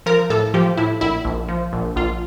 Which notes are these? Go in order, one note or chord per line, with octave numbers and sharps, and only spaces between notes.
F3 A#4
A2 A4
F3 G4
A2 E4
A#1 E4
A#1
F3
A#1
A#1 F4